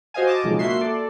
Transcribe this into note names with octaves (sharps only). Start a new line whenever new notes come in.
F#4 C5 D#5 F5 G#5
D#5 A5 D6
B1 C#3 F3 G#3 A#3
A#3 F#4 E5 C6 C7
A4 D5